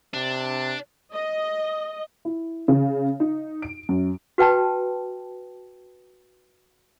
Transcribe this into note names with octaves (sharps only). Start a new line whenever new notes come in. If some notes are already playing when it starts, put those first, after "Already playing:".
C3 D4
D#5
E4
C#3
D#4
D7
F#2
F#4 B4 G5 A5 B5